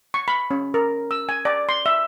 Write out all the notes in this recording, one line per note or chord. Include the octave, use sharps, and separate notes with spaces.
C#6
B5
C#4
A#4
E6
G#5
D5
C6
E5